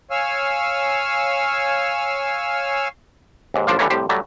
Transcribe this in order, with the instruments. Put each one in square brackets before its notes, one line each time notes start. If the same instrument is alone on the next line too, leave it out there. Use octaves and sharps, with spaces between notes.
[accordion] C#5 F5 G#5 E6 F6
[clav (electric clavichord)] D#2 G#2
A1 F3 D4 C5 D5 F5
D3 E3 G3 A3 A#3 C#5
C2 A2 G4 C5
F#3 G3 A3